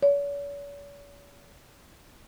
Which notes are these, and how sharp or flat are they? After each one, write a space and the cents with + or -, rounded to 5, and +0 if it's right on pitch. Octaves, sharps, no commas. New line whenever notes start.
C#5 +45